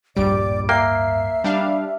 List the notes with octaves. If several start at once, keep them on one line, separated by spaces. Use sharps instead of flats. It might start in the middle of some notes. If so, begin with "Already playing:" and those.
D1 A#1 G2 G3 D5 D7
A#3 E5 G5 C7
G3 D4 F5